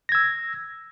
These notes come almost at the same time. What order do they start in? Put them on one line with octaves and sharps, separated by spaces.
A#6 G#6 E6